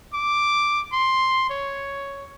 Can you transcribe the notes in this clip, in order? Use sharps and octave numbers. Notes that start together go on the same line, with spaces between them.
D6
C6
C#5